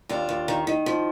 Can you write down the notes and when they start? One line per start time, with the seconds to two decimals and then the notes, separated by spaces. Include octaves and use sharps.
0.09 D#2 D4 F4
0.29 D#2
0.48 D#3
0.67 D#3
0.86 F3